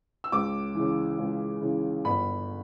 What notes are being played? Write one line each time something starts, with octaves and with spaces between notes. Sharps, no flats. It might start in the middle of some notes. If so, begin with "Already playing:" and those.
E6
C#2 D6
C#3 E3
C#2
C#3 E3
G1 B5